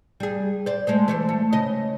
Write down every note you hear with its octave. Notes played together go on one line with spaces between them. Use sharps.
G3 G#4
C5 D5
G#3 A3 C5
E3 A3 C5
A3
C#3 D#5